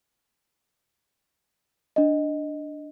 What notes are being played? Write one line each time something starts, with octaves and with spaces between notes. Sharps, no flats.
D4 D#5